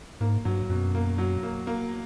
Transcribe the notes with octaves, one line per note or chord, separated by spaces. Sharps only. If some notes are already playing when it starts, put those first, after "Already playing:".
G#2 A#3
G2 F#3
F#2 B2
A#3
F#3
A#3
A#3